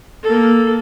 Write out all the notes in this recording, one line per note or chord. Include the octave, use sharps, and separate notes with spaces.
A#3 A4